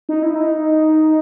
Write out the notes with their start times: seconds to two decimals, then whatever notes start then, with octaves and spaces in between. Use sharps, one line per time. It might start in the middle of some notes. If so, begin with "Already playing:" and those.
0.09 D#4
0.23 E4
0.36 D#4